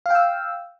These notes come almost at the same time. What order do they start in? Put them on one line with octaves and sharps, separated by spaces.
F5 G5 E6